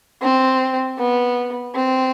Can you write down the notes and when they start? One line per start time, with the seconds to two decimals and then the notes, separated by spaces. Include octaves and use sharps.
0.21 C4
0.98 B3
1.74 C4